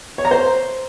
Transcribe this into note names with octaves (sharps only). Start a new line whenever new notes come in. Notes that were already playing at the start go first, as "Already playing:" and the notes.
C#5
A#5
C5